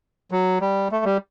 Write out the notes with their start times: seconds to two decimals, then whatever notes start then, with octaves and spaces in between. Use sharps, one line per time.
0.31 F#3
0.61 G3
0.92 A3
1.05 G3